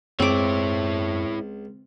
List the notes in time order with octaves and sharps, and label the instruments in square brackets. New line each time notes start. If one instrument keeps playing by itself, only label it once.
[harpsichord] C#2 [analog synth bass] F#2 [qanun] C4 D6 [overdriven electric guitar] E4 C#5